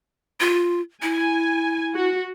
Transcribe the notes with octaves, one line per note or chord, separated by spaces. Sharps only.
F4
E4 G#5
F#4